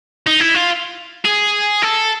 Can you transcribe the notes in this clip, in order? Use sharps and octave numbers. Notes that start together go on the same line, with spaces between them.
D#4
E4
F4
G#4
A4